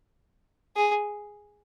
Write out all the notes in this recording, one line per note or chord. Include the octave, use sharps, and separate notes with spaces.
G#4